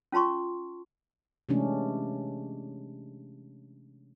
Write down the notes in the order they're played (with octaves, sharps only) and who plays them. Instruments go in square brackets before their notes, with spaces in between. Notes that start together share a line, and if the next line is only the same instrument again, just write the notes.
[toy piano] C#4 F4 A5 C6 C#6
[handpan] C3 E3 G#3 A3 C#4 D4